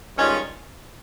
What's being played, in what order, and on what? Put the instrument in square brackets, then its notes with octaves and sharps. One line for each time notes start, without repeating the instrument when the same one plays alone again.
[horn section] G2 D#3 G#3 C#4 F4